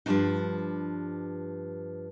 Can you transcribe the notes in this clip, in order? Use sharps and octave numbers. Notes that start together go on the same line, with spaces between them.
G2 F3 G3 A3 D4 D#4